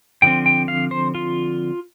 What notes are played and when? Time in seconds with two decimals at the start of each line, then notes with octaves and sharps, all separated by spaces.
0.22 D3 F3 C4 G5
0.46 G5
0.68 F5
0.91 C5
1.15 F4